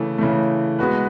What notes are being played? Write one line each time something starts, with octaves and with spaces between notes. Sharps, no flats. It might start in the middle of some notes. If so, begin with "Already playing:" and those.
Already playing: C#3 E3 A3
C#3 E3 A3
G#3 B3 F#4 B4